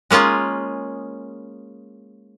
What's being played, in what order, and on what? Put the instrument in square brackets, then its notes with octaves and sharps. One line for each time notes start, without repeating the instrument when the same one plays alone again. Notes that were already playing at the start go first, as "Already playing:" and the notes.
[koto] G#3 A#3 C#4 F4 G#4